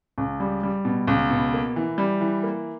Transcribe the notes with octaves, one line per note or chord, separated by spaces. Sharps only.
C#2
G3
G3
B2
C#2
B2
A#3
E3
G3
E3
A#3